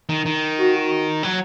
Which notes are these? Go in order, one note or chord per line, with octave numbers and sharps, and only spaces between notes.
D#3
D#3
F#4
F#3